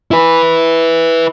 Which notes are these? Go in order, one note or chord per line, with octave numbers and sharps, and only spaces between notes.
E4 B4